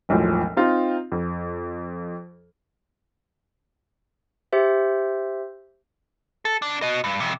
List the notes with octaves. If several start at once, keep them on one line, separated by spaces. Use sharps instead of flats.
E1 B1 A2 F3
C4 D#4 F4
F2
G4 C5 E5
A4
C2 D4
F#4 D#5
G2
F2 C3